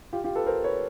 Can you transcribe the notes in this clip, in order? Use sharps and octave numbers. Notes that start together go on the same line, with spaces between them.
F4 G4
F4 G4
A4 B4
A#4 C5
B4 C#5